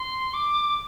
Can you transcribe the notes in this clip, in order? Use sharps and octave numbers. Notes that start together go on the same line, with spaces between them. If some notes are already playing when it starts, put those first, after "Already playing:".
Already playing: C6
D6